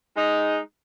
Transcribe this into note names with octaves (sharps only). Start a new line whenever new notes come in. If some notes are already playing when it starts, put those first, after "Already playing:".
G#3 D#4